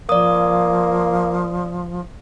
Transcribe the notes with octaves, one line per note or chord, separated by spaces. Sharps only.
F3 A#3 D5 D#6